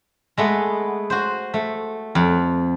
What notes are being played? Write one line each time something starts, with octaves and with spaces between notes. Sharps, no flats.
G#3 A3 B3
F#4 C5
A3
F2